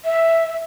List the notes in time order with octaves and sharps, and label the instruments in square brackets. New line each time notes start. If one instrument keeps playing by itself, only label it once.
[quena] E5